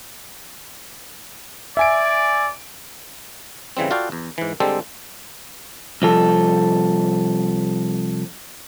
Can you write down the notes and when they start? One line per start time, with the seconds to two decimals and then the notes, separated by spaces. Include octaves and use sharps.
1.77 D5 E5 G#5 D7
3.77 A2 C#3 E3 G3 C4
3.91 F4 F#4 A4 D5 F5 G5
4.12 E2
4.38 G#2 E3
4.60 D3 G3 G#3 C4 G4 A4
6.02 C2 F3 A4